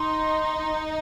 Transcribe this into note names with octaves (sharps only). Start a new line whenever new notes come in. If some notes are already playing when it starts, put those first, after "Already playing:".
Already playing: D#4 C6